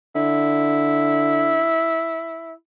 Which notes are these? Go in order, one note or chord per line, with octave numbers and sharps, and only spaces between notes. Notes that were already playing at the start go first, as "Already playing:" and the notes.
D3 E4